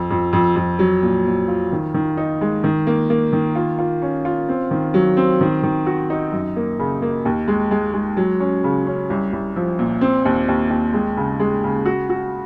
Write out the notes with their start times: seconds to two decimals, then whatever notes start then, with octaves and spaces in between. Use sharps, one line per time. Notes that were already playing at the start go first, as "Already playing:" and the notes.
Already playing: F2
0.11 F2
0.33 F2
0.56 F2
0.79 F#3
1.03 A#2
1.26 A#2
1.48 F4
1.72 D#3
1.94 D#3
2.17 D#4
2.41 G#3
2.64 D#3
2.87 A#3
3.10 A#3
3.33 D#3
3.55 F4
3.79 F4
4.02 C#4
4.25 F4
4.49 C4
4.71 D#3
4.94 F#3
5.17 C4
5.41 D#3
5.63 D#3
5.86 F#4
6.10 D#4
6.32 F#2
6.56 A#3
6.79 C#3
7.02 A#3
7.25 D#2
7.48 G#3
7.71 G#3
7.94 G#3
8.17 F#3
8.40 C#4
8.64 C#3
8.87 C#4
9.10 C2
9.33 C2
9.56 F3
9.79 A#2
10.01 C4
10.25 D#2
10.48 D#2
10.70 D#2
10.94 G#3
11.17 C#3
11.40 G#3
11.64 C#3
11.86 F#4
12.10 F#4